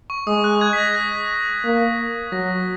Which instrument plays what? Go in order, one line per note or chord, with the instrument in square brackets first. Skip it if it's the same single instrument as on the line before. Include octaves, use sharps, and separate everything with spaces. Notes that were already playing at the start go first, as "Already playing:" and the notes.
[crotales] C#6
[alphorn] G#3 [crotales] D#6
[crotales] F#6
G#6
B6
A#6
G#6
[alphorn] A#3
[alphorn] F#3 [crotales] A#6